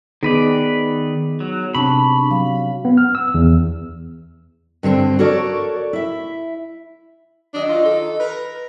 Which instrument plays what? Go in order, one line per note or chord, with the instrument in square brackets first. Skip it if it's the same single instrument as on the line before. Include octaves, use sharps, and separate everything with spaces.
[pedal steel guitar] D#3 B4 D5 [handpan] B3 D#4 G#4
[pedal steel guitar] F#3
[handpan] C3 C4 [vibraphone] D4 A5 C#6 [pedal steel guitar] B5
[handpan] F#3 [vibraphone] F5
[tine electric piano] B3
F6
E6
E2
[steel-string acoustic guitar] G2 D3 C4 D4
F#4 A4 A#4 C#5 D5
E4 E5
[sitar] D#3 F#3 D#5 [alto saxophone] D4
[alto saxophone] F4
A4
[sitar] A#4 [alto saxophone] B4